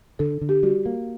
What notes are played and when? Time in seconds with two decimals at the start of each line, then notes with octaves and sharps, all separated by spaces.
0.19 D3 A4
0.41 D3
0.49 G4
0.63 G3 F#4
0.86 A#3